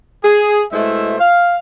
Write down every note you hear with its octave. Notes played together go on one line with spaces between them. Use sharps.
G#4
B2 G#3 A3 E4 C5 E5
F5